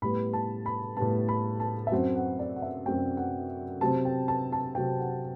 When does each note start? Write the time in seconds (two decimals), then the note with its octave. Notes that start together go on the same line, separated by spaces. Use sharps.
0.02 A2 G3 B3 B5
0.33 A5
0.66 B5
0.97 A2 G3 B3 A5
1.29 B5
1.60 A5
1.87 E5
1.92 F#2 F#3 C4 F#5
2.15 F#5
2.39 D5
2.56 F#5
2.62 E5
2.86 F#2 F#3 C4 G5
3.17 F#5
3.81 C3 F#3 C4 A5
4.05 G5
4.28 A5
4.52 A5
4.75 C3 F#3 C4 G5
4.99 F#5